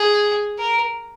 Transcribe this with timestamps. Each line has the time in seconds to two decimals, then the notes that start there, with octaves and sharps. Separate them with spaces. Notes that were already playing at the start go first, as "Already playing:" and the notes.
Already playing: G#4
0.59 A#4